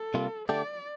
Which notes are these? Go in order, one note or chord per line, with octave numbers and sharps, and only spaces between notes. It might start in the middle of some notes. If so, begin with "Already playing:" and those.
Already playing: A4
C3 G3 A#3 F4
D3 A3 D4 G4 D5